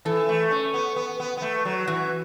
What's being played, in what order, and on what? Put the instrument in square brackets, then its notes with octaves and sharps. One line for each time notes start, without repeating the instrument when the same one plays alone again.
[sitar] E3 [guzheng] A4
[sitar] A3
C#4
B3
B3
B3
B3
A3
F#3
[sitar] E3 [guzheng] F#4